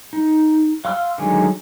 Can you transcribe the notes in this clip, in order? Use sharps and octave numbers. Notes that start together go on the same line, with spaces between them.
D#4
F5 F#5 C6 E6 F6
D3 D#3 F#3 G#3 G#5